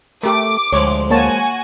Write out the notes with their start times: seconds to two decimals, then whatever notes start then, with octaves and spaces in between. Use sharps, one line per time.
0.23 A3 G4 A#4 D6
0.73 D2 F3 G#3 C#5
1.11 A#3 F#4 C#5 G#5 A5